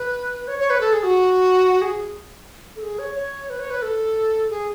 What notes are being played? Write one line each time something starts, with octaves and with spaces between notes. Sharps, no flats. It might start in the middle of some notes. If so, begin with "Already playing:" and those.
Already playing: B4
C#5
C#5
B4
A4
G#4
F#4
G#4
A4
G#4
C#5
C#5
B4
C#5
B4
A4
G#4